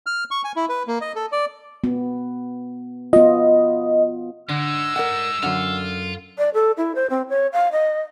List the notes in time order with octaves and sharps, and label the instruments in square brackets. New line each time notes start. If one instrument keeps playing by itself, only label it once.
[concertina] F6
C#6
G#5
E4
B4
A#3
D#5
A4
D5
[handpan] B3
[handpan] B3 F4 [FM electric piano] D#5
[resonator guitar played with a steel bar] D3 [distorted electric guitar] G#3 D#4 [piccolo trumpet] E6
[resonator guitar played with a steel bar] A#4 D5 F#5
[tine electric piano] F#2 F6 [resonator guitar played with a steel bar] D3 F#5 [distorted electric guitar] F4
[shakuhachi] D5
A4
E4
C5
C4
C#5
F5
D#5